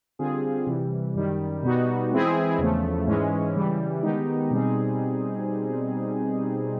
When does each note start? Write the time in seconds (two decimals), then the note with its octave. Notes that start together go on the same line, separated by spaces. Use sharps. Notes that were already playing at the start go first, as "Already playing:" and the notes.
0.19 D3 G3 C4 F4 G#4
0.67 C3 E3 G3
1.15 F#2 D#3 G3
1.63 B2 G3 B3 D#4 F#4
2.11 E3 G#3 C4 E4 G#4
2.58 E2 C#3 F3 A3
3.07 G#2 E3 G#3 C#4
3.55 C#3 E3 G3
4.03 D#3 G#3 B3 D#4 G4
4.51 B2 G3 C4 D#4 G#4